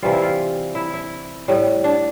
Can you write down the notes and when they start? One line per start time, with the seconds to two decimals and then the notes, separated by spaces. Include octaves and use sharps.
0.02 C3 E3 G3 F4
0.12 E4
0.22 F4
0.75 E4
0.94 E4
1.48 A2 G3
1.84 D4